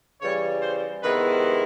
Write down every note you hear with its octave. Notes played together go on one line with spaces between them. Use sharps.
C#3 E3 G3 C#5
C5
C3 D#3 G#3 B3 E4 B4